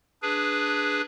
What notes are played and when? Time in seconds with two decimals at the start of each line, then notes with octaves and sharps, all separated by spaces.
0.22 D4 G#4 B4